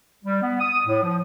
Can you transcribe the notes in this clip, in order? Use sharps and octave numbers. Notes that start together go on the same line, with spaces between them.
G3
B3
D#6
A2
F3